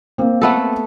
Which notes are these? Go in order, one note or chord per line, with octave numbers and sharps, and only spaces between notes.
A#3 C4
A3 B3 A4